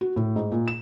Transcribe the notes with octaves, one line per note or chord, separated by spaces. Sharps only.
F#4
A2
G#2
A#2
E7